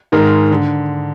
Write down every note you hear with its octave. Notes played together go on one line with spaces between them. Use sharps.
G#2 D#3 G#3 A#4
D3